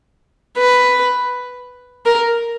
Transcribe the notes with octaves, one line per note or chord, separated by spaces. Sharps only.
B4
A#4